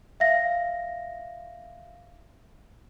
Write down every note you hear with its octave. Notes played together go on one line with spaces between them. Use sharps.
E5 F5 A#6